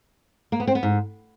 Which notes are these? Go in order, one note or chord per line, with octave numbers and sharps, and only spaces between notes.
A#3
B3
C4
B3
G#2